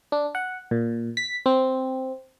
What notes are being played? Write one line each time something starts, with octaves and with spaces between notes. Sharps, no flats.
D4
F#5
A#2
B6
C4